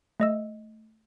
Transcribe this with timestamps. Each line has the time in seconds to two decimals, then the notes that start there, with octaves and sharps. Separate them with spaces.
0.20 A3 D#5 E6